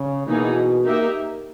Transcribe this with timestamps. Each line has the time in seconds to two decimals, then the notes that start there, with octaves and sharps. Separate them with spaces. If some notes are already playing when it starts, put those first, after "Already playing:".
Already playing: C#3
0.27 B2 E3 A#3 D#4 G#4
0.84 A#3 D#4 G4 A#4 E5